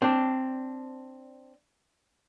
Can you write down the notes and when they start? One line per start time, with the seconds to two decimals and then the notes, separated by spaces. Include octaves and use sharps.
0.02 C4 D4